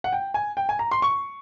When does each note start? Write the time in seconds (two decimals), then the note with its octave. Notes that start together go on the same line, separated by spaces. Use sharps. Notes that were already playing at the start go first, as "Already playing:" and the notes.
0.04 F#5
0.13 G5
0.34 G#5
0.57 G5
0.69 G#5
0.79 A#5
0.91 C6
1.02 C#6